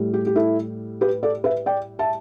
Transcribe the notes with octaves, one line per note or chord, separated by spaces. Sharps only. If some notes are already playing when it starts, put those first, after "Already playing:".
Already playing: A2 G3
G4
G4
E4 A4
G4 B4
A4 D5
B4 E5
D5 G5
E5 A5